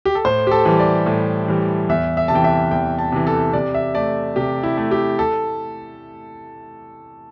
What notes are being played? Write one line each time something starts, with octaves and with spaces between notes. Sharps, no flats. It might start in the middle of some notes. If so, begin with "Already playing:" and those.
G4
A4
A2 C5
G4
A4
E3 G3
D5
A2
E3 G3
E2 E5
E5
C3 A5
E3 G5
E5
E2 G5
A5
C3 E3
A4
C3 D5
E5
A3 D5
C3 G4
E4
A3
G4
A4